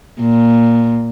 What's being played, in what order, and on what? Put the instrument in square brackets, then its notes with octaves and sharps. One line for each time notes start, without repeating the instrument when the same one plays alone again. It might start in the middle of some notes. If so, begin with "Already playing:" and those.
[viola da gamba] A#2